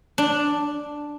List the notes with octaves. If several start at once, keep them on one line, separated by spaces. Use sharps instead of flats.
D4